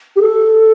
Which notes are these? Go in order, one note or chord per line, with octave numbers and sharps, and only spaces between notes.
G4
A4